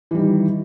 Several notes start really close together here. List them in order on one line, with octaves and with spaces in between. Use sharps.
E3 G3 D#3